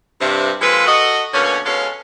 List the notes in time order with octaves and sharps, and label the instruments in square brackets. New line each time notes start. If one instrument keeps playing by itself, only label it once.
[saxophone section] G2 C3
F3 G#3 A#3 C4 A4 B4
F#4 A4 D#5
B2 D3 A#3 C#4
B2 G#3 C#4 A4 F5